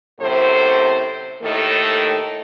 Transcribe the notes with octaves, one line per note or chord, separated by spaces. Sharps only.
F#2 A2 C3 A4 C5
D#2 A2 D#3 A3 A4